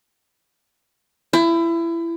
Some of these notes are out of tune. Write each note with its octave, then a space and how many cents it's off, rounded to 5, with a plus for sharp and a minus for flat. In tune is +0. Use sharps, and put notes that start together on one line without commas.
E4 +25